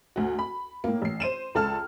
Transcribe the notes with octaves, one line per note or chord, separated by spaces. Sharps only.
D2 F#4
B5
A2 A#3
A1 C7
C5 D#7 E7
C#2 A4 A5 F6